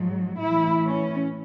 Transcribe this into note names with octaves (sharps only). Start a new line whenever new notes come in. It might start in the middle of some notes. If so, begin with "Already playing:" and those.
Already playing: G#2 F#3
A2 E3 E4
C#4